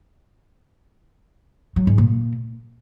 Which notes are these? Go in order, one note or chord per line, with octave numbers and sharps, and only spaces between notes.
F#3
G#2
A#2